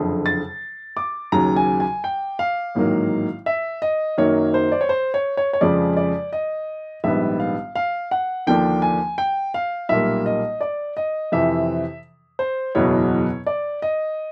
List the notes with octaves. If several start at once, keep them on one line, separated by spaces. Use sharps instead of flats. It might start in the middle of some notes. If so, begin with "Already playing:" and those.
Already playing: F#1 F2 D3
A6
D6
D#2 C#3 F#3 A#5
G#5
G#5
G5
F5
A1 G#2 D#3 F#3 A#3
E5
D#5
F#2 D#3 F#3 A#3 C#5
C5
D5
C#5
C5
C#5
C#5
C#5
F2 C#3 F3 G#3 D5
D5
D#5
A#1 G#2 D#3 G3 B3 E5
F5
F5
F#5
D#2 D3 F3 A#3 D4 G5
G#5
G5
F5
B1 A#2 G3 A#3 E5
D#5
D5
D#5
F2 C3 E3 E5
C5
F#1 E2 B2 F#3 B3 C#5
D5
D#5